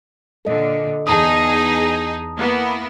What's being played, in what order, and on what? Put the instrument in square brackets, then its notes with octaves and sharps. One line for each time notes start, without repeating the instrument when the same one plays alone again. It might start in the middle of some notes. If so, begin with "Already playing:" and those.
[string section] A#2 D3 [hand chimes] A4 D#5
[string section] E2 D#4 G#4 [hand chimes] A5 A#5 D#6
[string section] A#3 B3 E4